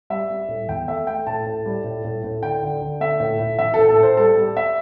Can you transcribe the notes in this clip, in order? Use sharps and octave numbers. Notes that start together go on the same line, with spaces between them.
G3 E5
G3
A2
E2 G5
A3 E5
A3 G5
A2 A5
A2
G3
A2
A2
A2
D3 G5
D3
D3
A3 E5
A2
A2
E3 E5
A2 A4
A4
A2
C5
G3 A4
G3
E5